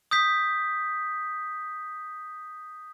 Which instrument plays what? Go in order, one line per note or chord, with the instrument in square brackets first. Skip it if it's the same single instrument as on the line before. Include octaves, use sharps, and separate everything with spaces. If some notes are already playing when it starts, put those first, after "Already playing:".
[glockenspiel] D#6 G6 B6